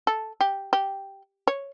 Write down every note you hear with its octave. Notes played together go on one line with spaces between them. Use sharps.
A4
G4
G4
C#5